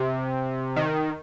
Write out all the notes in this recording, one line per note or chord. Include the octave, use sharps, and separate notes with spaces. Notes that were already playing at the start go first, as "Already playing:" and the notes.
Already playing: C3
D#3